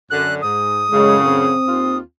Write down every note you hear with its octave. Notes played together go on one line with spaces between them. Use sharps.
F#2 D3 F#6
G#2 D#6
F#2 A2 C#3 G#3
C4
D#2 F4